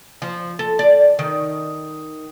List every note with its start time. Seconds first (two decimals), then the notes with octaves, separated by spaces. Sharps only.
0.22 F3
0.59 A4
0.79 D5
1.19 D#3